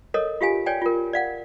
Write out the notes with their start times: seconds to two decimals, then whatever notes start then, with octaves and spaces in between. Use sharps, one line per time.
0.14 A4 A#4 C#5 D#5
0.41 F4 G4 F5 G#5
0.66 C#5 D5 G5 G#5
0.82 F4 A#4
1.13 D5 F5 F#5